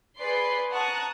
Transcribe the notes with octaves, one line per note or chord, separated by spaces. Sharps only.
G#4 B4 D5 C6 C7
F#5 A5 A#5 C#6 D#6 F#6